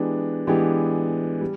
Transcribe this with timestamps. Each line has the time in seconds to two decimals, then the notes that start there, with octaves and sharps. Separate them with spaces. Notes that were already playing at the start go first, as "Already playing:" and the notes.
Already playing: E3 G#3 B3 D4 G4
0.47 E3 G#3 B3 D4 G4
1.41 G3